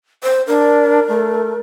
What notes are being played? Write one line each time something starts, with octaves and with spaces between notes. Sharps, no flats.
C5
D4 A#4
A3